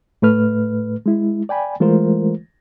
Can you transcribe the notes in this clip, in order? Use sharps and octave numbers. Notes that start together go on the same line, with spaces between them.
A2 A3 B4 F6
G#3 E4
D5 G5 G#5 B5
E3 G#3 A3 F4 A#4 C5